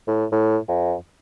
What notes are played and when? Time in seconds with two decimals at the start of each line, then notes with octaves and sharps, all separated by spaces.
0.08 A2
0.32 A2
0.69 F2